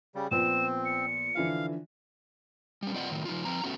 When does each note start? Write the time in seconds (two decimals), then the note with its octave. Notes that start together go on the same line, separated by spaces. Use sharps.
0.15 C#3 G3
0.31 A#2 F3 B3 C4 E7
0.85 C#7
1.35 D3 E3 F3 F5
2.83 G3 C#4
2.94 C4 F4 D5 D#5 F#5
3.11 A2 D#3 F#3
3.25 F3 D#4 F4
3.45 F3 C4 A#5
3.64 A3 B3 C#4 F#4